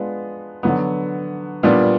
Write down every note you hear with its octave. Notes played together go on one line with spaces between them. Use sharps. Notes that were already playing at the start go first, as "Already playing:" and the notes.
Already playing: G#3 B3 D4 F4
D3 F#3 B3
A#2 G3 B3 D4